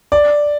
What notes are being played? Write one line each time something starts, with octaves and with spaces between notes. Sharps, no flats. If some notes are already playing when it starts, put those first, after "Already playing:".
D5